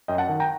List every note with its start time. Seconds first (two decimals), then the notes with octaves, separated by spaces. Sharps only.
0.08 F#2 D#5 G5
0.18 F#5 A5
0.29 D#3
0.40 G5 A#5